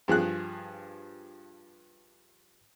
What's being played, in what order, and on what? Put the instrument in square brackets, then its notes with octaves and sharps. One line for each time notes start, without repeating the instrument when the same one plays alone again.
[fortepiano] G2 F3 G#4 F#6